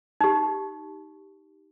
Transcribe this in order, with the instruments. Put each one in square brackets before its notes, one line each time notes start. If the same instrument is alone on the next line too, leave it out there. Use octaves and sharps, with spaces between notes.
[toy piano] D#4 G4